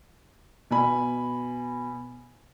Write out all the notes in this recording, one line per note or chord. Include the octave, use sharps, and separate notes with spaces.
B2 G#5 B5